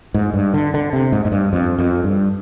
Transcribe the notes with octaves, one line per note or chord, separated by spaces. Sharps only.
G#2
G2
D3
D3
C3
G#2
G#2
G2
F2
F2
G2